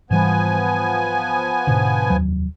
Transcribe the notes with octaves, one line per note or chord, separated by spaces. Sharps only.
G#2 E3 F3 G3 B3 G#5
G#2 B2 D3
F1 D#2 F#3